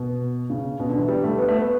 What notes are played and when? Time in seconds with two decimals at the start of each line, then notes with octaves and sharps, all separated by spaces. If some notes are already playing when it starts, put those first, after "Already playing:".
Already playing: B2
0.50 C#3
0.80 B2
0.89 D3
0.98 E3
1.08 G3
1.24 A3
1.38 B3
1.48 A3
1.57 B3